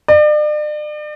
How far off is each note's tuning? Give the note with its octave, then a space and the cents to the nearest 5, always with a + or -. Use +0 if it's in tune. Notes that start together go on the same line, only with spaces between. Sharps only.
D5 +40